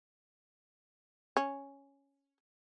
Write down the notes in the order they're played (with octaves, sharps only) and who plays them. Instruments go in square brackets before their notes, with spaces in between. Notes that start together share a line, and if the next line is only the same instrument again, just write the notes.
[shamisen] C#4